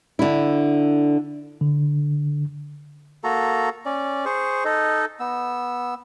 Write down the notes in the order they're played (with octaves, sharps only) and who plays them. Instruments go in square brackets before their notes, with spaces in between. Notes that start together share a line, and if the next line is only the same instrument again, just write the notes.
[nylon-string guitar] D3 E4
[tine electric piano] D3
[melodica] A#3 F#4 A4 A#5
C#4 D5
G#4 C5 C#6
D#4 A4 D#5
B3 E6